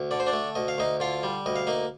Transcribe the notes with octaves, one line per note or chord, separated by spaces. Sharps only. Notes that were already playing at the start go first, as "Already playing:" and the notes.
Already playing: D2
D3 D5
C5
D4 D5
A3
D2 D#5
F5
D2 D#4 D#5
D3 F4 F5
G3
D2 D#5
F5
A#3 D#4 D#5